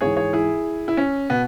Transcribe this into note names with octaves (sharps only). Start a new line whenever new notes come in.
G#2 E3 G#4 C#5
G#4 C#5
E4 G#4
E4
C#4
B2 B3